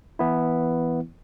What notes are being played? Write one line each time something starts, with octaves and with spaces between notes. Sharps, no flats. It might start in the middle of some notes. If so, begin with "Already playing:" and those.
E3 B3 E4